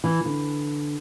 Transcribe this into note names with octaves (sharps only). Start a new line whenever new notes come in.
E3
D3